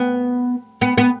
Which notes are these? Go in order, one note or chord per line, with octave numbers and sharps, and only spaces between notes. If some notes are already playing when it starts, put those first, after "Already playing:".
Already playing: B3
B3
B3